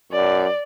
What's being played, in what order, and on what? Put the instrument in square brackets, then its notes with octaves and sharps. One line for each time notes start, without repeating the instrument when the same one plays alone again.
[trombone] F#2 [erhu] D5